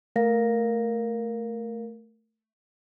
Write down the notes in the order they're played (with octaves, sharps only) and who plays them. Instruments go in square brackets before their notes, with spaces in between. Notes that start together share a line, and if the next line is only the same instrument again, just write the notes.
[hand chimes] A3 A#4 F5 A#6